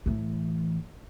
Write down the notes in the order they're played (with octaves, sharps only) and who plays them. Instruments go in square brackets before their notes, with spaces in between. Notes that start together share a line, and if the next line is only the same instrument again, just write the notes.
[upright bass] A2 E3